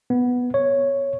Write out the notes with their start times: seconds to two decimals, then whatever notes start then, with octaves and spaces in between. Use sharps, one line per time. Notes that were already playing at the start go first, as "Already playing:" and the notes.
0.10 B3
0.54 C#5